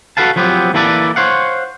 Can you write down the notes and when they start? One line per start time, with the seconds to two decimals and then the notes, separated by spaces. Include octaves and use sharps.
0.17 F#4 A4 B4 F5 A5
0.36 F3 F#3 B3 C4 G4
0.74 E3 A#3 E4 A4 B4 D5
1.16 C5 C#5 F5 F#5